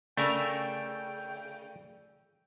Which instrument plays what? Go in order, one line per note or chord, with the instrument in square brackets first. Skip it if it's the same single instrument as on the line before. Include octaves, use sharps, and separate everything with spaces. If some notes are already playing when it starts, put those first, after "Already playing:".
[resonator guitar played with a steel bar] C#3 [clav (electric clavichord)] A3 A#4 [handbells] D5 E6 [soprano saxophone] G5